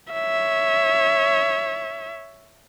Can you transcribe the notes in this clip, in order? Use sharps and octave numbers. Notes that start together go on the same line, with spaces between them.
C#5 E5